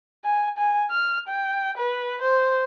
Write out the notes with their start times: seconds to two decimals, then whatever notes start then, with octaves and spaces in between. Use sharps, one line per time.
0.25 G#5
0.58 G#5
0.91 F6
1.28 G5
1.78 B4
2.22 C5